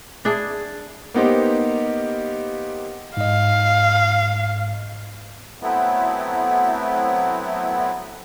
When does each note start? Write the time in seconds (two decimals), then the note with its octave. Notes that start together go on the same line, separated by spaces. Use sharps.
0.25 D4 E4 G#4
1.14 A#3 B3 D#4 G4 C5
3.17 G#2 D#5 F5
5.62 F#3 A3 B3 C4 E4